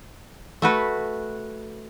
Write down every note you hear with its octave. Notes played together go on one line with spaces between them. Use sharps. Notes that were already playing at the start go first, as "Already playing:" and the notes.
A3 F#4 B4